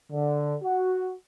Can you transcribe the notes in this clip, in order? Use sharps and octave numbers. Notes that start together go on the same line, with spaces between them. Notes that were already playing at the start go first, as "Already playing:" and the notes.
D3
F#4